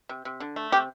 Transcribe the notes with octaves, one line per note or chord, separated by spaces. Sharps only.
C3
C3
D3
A3
C3 G4